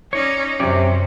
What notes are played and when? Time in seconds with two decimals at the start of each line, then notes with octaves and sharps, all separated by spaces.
0.13 C#4 D#4 C#5 D5
0.60 F#2 C3 C#4 G4 D5